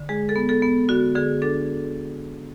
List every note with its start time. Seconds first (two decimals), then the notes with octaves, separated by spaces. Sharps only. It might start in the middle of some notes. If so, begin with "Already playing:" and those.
Already playing: D3
0.09 G#3 G#4
0.29 A4
0.36 B3
0.49 A4
0.62 B3
0.88 D3 F#4
1.15 D3 G#4
1.42 D4 A4